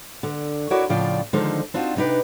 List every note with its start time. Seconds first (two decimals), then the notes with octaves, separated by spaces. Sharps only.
0.23 D3
0.70 E4 F#4 A#4 C#5 D5
0.89 A2 C#3 F3 F4 D5 G5
1.33 D3 D#3 F3 G#3 D#4 C5
1.74 C4 D4 D#4 F4 F#4
1.96 C3 D4 D#4 B4 G5